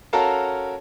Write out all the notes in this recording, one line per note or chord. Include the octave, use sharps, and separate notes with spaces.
C#4 F#4 A4 A#4 F5 A5